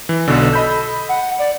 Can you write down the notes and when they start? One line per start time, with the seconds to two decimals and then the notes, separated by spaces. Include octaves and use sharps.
0.09 E3
0.28 B1 B2 D3 A4
0.53 D#5 B5 G6
1.09 F#5
1.39 D5